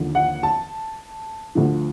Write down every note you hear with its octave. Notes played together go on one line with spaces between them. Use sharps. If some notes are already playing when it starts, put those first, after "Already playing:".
Already playing: D#2 D3 F3
F#5
A5
D2 D3 F3